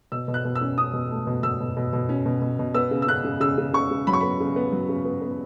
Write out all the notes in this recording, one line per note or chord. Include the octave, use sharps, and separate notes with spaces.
B2 E6
B2
F#6
B2
E6
C#4
C#4 D#6
B2
A3
B2
B2 E6
B2
B2
B2
C#4
B2
B2
B2
B3 E6
C#3
E6
C#3 F#6
C#3
C#3 E6
C#3
C#3 C#6
C#3
F#3 B5
C#6
B3 B5
C#3
B3
F#3
C#3
B3
B3